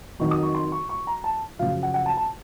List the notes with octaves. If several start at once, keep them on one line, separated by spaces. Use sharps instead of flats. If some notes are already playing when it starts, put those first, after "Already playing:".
F2 D#3 F#3 C#6
D#6
C#6
C6
C#6
C#6
A#5
A5
F#2 C#3 F3 F5
F#5
F#5
A5
A5